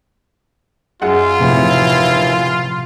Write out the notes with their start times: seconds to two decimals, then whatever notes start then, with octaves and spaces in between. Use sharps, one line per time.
1.01 F#2 G#3 F4 G#4 F#5
1.40 D#2 A2 C3 E3 F3